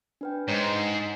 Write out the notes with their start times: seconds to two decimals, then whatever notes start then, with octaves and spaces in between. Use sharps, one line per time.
0.21 D4 B4 G5
0.48 G#2 C#5 D#5